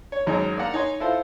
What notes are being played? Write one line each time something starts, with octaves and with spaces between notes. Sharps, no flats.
C#5
G#1 F#2 D#4 G#4 C#5 A#5
A#3 D5 F5 F#5 A#5
D#4 C#5 G#5 C6
E4 F4 A4 C5 F5